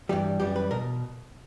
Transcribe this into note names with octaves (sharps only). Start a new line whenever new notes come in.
G2 E3 G3 G4
F#2 E3 G3 G4
B4
B2 A#4